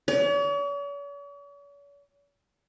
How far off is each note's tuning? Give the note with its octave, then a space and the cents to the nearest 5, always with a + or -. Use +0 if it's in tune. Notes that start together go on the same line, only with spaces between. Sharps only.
C#5 +45